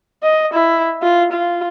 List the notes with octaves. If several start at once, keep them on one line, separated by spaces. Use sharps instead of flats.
D#5
E4
F4
F4